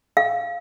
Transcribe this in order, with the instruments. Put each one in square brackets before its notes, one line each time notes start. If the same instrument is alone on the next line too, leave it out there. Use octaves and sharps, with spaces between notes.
[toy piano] F5